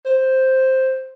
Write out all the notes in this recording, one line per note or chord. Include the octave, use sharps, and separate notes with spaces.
C5